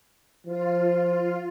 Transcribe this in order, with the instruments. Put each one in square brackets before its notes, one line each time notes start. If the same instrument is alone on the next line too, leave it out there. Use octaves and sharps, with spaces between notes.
[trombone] F3 [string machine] F4